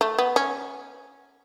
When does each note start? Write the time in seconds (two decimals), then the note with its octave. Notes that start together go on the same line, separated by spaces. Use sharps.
0.01 A3
0.18 B3
0.36 C#4